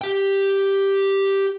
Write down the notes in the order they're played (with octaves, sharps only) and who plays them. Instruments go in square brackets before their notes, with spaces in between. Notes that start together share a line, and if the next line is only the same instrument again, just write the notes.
[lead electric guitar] G4 G5